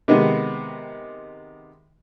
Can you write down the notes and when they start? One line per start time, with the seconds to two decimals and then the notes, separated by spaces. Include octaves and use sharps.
0.08 C3 D#3 G#3 B3